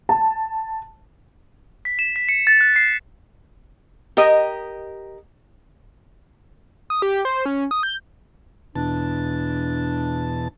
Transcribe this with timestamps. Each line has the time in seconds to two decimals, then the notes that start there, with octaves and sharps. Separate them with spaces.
0.09 A5
1.85 B6
1.99 E7
2.16 B6
2.29 C#7
2.47 A6
2.61 F#6
2.76 C7
4.17 G4 A#4 D#5
6.90 D#6
7.02 G4
7.25 C5
7.46 C#4
7.71 D#6
7.83 G6
8.75 E2 B2 D4 A5